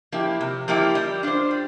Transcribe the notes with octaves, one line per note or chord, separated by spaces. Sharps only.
F3 A#3 E4 G4
C3
F3 A#3 E4 G4
G3
D4 F4 C5
G3